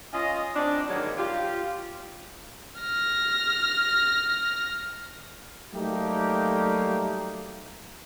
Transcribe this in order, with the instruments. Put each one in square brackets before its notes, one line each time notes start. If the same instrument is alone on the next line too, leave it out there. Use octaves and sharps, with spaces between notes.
[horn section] C#4 F4 D#5
C4 D4 D#4
G#2 D3 D#3 F#3 G3 A#3
F4 G4
[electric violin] F6 A#6
[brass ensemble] F#3 G3 A3 A#3 D#4 G4